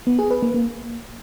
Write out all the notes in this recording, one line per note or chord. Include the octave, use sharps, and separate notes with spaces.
B3
G#4
B4
A#3
A#3